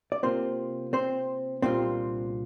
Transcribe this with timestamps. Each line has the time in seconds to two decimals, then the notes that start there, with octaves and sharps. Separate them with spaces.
0.12 D5
0.23 C3 A#3 C4 F4 C5
0.93 C4 C5
1.62 C2 A#2 G3 C4 D4 F4 C5